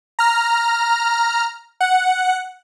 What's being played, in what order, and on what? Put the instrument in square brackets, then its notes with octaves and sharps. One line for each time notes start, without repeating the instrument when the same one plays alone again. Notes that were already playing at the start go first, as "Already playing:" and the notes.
[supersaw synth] A#5 F6
F#5